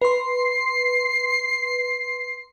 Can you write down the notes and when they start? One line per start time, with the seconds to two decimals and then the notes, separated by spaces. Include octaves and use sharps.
0.02 B4 C6 C7